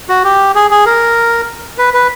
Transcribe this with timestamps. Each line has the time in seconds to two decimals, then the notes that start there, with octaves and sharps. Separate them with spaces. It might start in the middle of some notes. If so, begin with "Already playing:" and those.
0.09 F#4
0.24 G4
0.55 G#4
0.71 G#4
0.86 A#4
1.78 B4
1.94 B4